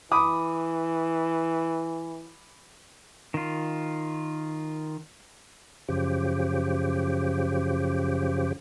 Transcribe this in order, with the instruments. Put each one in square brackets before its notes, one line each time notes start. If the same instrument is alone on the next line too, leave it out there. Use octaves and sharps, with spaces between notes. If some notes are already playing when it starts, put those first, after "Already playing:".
[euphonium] E3 [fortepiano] B5 D6 D#6
[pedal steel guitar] D#3 F4
[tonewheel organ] F#2 C#3 F3 G4